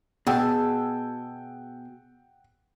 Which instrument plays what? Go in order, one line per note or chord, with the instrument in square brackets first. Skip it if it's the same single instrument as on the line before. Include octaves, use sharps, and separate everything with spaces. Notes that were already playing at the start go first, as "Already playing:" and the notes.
[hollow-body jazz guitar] B2 [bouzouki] G#4 A5 [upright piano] F#5 G5 E6